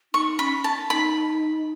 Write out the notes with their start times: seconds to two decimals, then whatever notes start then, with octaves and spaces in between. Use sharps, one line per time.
0.13 D#4 C#6
0.39 C#4 B5
0.64 A5
0.90 D#4 B5